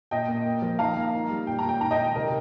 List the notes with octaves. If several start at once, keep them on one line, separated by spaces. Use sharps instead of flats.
A#2 D#5 G5
A#3
A#3
F3
D#3 F5 A#5
A#3
D#3
G3
A#2 G5
A#5
A#2 G5
D#3 A#5
D#5 G5
D#3
C3 A#4